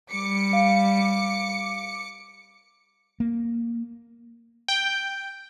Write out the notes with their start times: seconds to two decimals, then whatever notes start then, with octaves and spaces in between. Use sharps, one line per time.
0.11 G3 D6 C#7
0.53 F5
3.20 A#3
4.68 G5